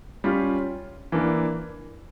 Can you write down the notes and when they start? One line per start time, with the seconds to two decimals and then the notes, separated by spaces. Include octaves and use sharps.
0.24 G3 C#4 F4
1.12 E3 A#3 D4